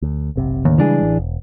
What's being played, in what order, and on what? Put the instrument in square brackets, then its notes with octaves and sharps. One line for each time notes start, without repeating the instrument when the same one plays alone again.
[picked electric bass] D2
F#1 B1 C3
[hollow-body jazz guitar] D#2 [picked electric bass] A2 D3
[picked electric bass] C#3 G3 G#3 [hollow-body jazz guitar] E3 D4 G#4
[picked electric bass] A1
E1